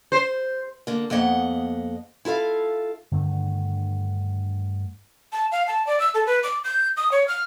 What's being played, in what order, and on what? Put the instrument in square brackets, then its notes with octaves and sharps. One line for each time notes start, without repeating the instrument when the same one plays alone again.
[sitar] C5
[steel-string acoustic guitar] D3 A#3
F2 A#3 B3 D#5 F#5
E4 F4 A4 F5
[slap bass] G2 D3 D#3 A3
[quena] A5
F5
A5
D5
E6
A4
B4
D6
G6
D#6
C#5
F6